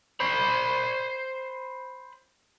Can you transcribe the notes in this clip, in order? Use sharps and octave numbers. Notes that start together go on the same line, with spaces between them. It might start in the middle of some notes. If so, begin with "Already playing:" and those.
C5 B5